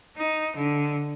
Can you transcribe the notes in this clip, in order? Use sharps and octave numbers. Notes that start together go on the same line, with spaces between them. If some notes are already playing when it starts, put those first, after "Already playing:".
D#4
D3